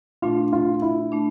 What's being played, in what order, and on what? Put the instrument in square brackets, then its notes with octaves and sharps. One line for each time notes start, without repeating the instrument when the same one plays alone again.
[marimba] A#2 A3 D4 [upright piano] F4
[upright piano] F4
E4
[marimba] A3 D4